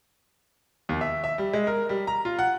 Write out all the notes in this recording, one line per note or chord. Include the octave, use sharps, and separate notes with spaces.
D#2
E5
E5
G3
G#3
A#4
G3
A#5
F4
F#5